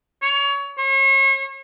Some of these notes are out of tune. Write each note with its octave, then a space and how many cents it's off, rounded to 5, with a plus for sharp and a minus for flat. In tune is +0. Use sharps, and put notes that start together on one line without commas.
C#5 +25
C#5 -40